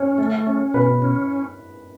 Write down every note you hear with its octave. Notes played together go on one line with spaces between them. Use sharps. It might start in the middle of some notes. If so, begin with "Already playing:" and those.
Already playing: C#4 C#5
A3
C#4
B2 B4
C#4